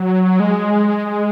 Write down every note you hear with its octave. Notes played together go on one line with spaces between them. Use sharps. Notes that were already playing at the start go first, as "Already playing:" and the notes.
Already playing: F#3
G#3